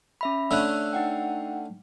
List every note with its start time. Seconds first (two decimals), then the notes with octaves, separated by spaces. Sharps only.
0.21 C#4 E5 B5
0.51 D3 A3 C#4 E6 F#6
0.93 D#4 F#5 G5